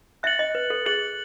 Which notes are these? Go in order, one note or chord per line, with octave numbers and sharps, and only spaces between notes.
E5 F#6 A6 C#7 F#7
D#5
B4
A4
G#4 F#6 A6 C#7 F#7